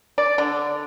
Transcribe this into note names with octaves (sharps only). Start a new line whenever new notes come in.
D5
D3